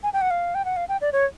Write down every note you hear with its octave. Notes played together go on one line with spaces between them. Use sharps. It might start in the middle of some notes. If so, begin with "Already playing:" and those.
G#5
G5
F#5
F5
G5
F#5
F5
G5
D5
C#5